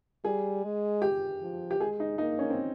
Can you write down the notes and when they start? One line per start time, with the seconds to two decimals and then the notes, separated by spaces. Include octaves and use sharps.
0.25 G3 G#4
0.64 G#3
1.02 G4
1.41 F3
1.71 G4
1.80 G#3 G#4
2.00 D#4
2.18 A#3 D#4
2.39 C#4
2.50 C4